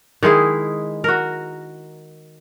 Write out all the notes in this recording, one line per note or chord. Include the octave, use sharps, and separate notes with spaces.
D#3 G#3 E4 G#4
F#4 A#4